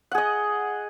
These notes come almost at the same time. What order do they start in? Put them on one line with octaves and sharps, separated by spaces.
F#5 G#4 D#5